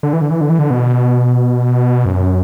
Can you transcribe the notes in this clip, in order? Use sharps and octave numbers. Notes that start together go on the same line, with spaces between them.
D3
E3
D3
E3
D3
E3
D3
B2
F#2